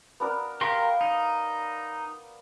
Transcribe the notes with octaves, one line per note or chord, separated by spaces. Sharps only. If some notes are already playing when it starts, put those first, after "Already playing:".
B3 D4 A#4
G4 A#4 F5 C6
D#4